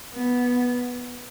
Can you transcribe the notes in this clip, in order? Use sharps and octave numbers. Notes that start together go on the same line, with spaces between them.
B3